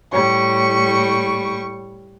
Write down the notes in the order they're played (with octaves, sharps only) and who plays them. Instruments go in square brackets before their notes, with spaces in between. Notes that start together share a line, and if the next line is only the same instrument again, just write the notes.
[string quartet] A2 G3 C#6